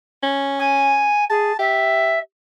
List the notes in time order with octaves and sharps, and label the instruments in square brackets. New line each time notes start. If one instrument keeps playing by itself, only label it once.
[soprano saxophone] C#4
[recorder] G#5
[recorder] G#4 [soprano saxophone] A5
[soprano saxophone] G4 [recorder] E5